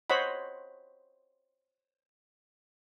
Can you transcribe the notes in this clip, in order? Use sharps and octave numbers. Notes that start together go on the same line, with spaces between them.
C5 C#5 D#5 F#5 B5